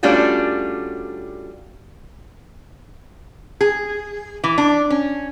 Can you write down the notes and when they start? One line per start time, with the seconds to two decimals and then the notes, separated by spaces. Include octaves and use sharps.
0.03 G3 A3 C#4 D4 F4 F#4
3.61 G#4
4.44 E3
4.58 D4
4.90 C#4